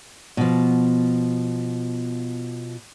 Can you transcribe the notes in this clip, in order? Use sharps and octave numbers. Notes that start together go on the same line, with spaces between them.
B2 F3